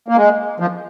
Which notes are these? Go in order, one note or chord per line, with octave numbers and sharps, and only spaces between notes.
A#3
G#3
F3